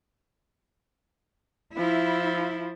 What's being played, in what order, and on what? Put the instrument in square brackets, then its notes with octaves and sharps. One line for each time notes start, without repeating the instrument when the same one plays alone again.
[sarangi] F3 [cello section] E4